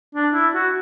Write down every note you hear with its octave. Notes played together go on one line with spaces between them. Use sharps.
D4
E4
F#4